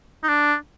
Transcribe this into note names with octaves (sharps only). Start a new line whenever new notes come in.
D#4
D4